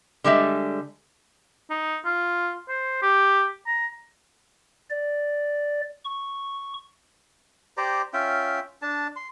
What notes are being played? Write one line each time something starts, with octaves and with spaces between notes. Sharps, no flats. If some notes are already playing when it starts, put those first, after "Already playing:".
D3 G3 G#3 E5
D#4
F4
C5
G4
A#5
D5
C#6
G4 C5 D5 A#5
C#4 F4 E5 G5
D4 A5
C6